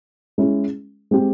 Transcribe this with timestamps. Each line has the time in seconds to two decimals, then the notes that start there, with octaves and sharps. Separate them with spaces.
0.38 G#3 C#4 E4 G#4
1.11 G#3 C4 G4